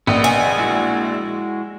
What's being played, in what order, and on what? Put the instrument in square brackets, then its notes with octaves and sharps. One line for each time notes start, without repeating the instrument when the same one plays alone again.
[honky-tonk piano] A#1 [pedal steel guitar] B3 D#5
[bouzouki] G#5
[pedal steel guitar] G#3 E4 F#4